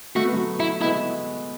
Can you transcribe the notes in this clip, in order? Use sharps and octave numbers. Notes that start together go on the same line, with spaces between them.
A3 F#4
B3
F#3 A3
E4
G#3 B3 E4